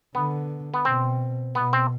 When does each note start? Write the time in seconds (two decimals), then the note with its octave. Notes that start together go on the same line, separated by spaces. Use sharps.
0.15 D3 B3
0.74 B3
0.85 B2 C4
1.55 B2 B3
1.73 C4